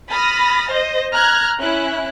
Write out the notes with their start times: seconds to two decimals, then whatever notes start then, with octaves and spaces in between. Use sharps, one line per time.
0.12 B5 D#6 F6 A6 A#6
0.71 C5 D#5
1.13 A#5 F6 F#6 G#6
1.60 C#4 E4 E5 F#6